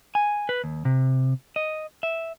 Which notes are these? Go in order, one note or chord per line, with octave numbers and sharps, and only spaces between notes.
G#5
B4
D#2
C3
D#5
E5